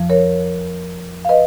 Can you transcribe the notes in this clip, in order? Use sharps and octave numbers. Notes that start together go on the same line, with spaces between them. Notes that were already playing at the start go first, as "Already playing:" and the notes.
Already playing: F2 F3
A#4 C#5
F5
B4 D#5